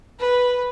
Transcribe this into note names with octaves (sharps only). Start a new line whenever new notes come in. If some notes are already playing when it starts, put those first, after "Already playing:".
B4